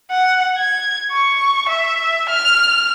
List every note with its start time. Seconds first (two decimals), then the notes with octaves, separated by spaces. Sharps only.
0.11 F#5
0.58 G#6
1.11 C#6
1.69 E5
2.29 F6